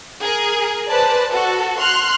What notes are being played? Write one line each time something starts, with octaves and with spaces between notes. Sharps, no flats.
G#4 A#4
B4 C5 D5 A5
F#4 A4
C6 F6 F#6